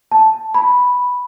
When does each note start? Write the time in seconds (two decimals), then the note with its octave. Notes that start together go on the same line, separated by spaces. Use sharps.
0.12 A5
0.55 B5